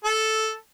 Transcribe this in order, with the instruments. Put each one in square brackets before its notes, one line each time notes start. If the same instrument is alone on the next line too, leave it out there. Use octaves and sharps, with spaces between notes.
[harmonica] A4